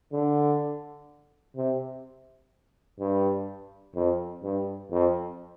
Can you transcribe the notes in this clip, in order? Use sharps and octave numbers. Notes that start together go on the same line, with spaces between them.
D3
C3
G2
F2
G2
F2